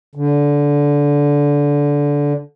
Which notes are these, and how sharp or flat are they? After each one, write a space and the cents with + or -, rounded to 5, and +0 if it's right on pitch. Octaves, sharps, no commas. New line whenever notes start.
D3 -20